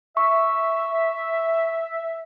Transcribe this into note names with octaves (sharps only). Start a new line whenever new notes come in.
E5 C#6